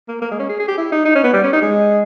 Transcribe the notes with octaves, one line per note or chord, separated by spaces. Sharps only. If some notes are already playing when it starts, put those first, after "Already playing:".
A#3
A#3
G#3
C#4
G#4
G#4
G4
E4
D#4
D#4
C#4
B3
G3
C#4
D#4
G#3